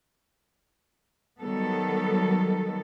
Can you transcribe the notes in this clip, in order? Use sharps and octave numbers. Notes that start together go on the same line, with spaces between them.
D#3 F#3 G3 B3 A4